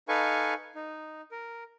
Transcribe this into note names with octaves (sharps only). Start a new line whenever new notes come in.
D#4 A4 B4 F5 G#5 C#6
D#4
A#4